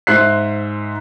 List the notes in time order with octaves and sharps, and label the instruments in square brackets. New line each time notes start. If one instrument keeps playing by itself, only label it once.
[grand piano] G#2 C5 E5 F#6 C7